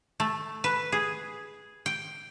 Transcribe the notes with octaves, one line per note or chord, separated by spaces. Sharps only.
A3
B4
G#4
G5